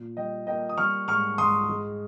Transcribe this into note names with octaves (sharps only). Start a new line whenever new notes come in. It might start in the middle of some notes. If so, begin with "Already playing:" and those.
Already playing: A#2
G3 D#5 G5
A#3 D#5 G5
D#6
G3 C#6 F6
G#2 C#6 F6
G#2 C6 D#6
G#3